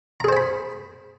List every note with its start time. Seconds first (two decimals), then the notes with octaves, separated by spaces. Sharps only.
0.20 A#5
0.24 G#4
0.28 C5
0.33 G#5
0.37 B5